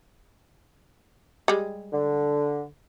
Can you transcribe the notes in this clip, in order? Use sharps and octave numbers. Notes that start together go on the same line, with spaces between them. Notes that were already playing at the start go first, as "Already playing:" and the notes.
G3 G#3
D3